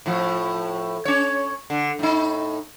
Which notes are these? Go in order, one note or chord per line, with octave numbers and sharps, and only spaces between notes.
A2 F3
C#4 C#5
D3
A2 D#4